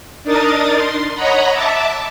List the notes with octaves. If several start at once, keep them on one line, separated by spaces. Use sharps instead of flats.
D4 D#4 A#4 D#6 A6
C6
C#5 D#5 F#5 A#5 B5
E5 A5 D6